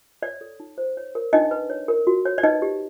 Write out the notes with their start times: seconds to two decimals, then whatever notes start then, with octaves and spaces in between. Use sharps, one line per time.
0.23 C#5 D5
0.41 A4
0.60 D#4
0.78 C5
0.97 C#5
1.15 A#4
1.33 D4 D#4 D#5
1.51 B4
1.70 C#5
1.88 A#4
2.07 F#4
2.25 C#5
2.38 D5
2.43 D#4 B4 D#5
2.62 G4